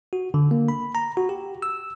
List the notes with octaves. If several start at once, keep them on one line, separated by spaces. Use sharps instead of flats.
F#4
D3
A#3
B5
A#5
F#4
G4
E6